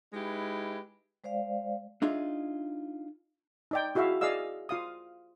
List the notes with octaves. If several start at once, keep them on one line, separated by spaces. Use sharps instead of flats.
G#3 D#4 E4 G4 B4
G#3 C5 D5 F5
D4 D#4 F4 G#4 E5
D#4 D5 G5
E4 F#4 G#4 E5 F5
G#4 D5 D#5 F5 E6
F4 F5 D#6